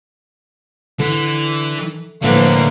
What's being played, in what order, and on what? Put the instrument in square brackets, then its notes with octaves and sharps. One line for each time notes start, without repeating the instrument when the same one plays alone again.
[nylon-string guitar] D3 [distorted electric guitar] E3
[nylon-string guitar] A2 D3 E3 [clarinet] F3 [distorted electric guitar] G3 E4 [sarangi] A#3